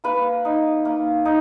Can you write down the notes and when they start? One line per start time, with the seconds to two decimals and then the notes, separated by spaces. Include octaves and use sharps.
0.04 A#3 B4 B5
0.45 D#4
0.85 A#3
1.25 D#4